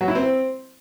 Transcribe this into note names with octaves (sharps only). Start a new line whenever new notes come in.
F#3
E4
C4